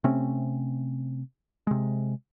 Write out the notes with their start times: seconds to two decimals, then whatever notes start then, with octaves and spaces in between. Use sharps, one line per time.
0.04 C3 A3 C4 C#4
1.67 C3 G#3